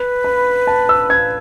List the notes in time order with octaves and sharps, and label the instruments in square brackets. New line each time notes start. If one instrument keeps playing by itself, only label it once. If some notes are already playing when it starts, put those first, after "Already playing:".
Already playing: [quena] B4
[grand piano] B5
A5
E6
G#6